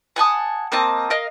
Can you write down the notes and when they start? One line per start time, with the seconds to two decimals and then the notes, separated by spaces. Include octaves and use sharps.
0.16 F#5 G#5 A5 D#6
0.72 A#3 C4 D#5 A5
1.10 A#4 D#5 F5